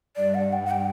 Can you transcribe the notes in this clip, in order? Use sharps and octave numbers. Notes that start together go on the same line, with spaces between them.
G2 D5
F#5
G5
F#5
G5